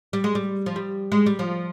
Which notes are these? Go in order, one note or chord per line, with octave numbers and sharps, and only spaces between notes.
G3
G#3
G3
F3
G3
G#3
G3
F3